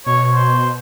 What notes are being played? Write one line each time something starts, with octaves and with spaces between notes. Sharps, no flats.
B2 C#5
C5